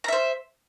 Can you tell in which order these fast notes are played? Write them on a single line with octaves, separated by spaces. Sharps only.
A#5 E5 C5